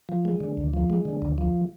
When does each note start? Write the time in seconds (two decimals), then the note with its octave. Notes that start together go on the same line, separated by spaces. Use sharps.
0.09 F3
0.25 G#3
0.40 D3
0.57 D2
0.74 F3
0.90 G#3
1.05 D3
1.22 D2
1.38 F3